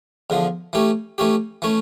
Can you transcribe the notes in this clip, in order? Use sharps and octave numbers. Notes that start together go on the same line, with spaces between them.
E2 D3 F3
E3 A3 C#4 G4
E3 A3 C#4 G4
E3 A3 C#4